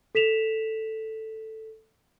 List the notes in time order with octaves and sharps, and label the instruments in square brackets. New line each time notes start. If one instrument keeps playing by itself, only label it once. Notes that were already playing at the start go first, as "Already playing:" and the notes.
[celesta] A4 B6 E7 F7